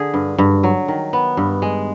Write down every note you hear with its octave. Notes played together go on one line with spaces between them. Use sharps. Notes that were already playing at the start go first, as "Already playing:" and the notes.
Already playing: D3 G#4
G2
G2
F#3
D#3
B3
G2
G#3